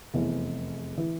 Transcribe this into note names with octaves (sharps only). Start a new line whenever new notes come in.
F1 E2 E3
E3